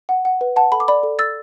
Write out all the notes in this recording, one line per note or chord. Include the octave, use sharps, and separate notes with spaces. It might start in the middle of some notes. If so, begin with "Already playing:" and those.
F#5
F#5
B4
F#5 A5
A4 B5
D6
D5 B5
A4
A4 E6 A6